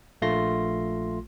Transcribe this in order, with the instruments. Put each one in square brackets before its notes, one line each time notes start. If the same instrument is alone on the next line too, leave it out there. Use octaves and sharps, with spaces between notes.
[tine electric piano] A#1 A3 F4 C6 A#6